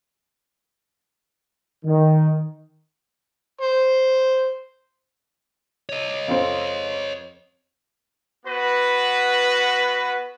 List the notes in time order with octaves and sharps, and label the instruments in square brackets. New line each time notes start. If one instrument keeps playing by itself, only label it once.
[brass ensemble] D#3
[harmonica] C5
[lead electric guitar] C#5 D#5
[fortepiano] F2 C4
[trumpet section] B3 F#4 B4